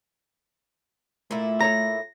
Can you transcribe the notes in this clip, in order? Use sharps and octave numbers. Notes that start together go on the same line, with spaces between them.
A#2 A3 E4
A4 C#5 A#5 A#6